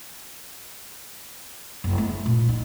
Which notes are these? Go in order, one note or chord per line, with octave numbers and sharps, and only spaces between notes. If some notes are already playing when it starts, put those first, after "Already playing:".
F#1
A3
A#2
D#4